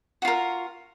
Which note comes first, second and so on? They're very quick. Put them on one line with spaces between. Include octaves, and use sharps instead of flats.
F#4 F4 A#4